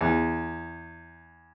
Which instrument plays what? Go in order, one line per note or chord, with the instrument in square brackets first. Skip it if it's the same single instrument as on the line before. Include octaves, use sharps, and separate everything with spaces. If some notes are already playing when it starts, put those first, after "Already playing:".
[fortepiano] E2